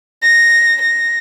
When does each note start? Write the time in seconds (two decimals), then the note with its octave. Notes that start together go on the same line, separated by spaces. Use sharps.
0.23 A#6
0.81 A#6